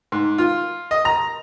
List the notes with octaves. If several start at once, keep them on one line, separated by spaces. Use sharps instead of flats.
G#2
F4
D#5
A#5